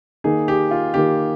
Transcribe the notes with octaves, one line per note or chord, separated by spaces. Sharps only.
D#3 A#3 D#4 G#4
G4
F4
D#3 A#3 D#4 G4